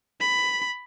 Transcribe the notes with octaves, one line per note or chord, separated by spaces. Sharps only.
B5